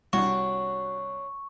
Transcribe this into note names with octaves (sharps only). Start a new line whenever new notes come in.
C2 D4 F#4 C#5 C#6